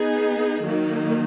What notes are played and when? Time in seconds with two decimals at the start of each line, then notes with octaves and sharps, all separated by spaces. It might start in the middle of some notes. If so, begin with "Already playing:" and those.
Already playing: B3 D#4 G#4
0.64 D#3 F#3 A#3 D#4